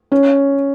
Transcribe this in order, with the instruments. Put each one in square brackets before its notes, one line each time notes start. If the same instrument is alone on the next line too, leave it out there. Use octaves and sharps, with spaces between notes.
[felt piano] C#4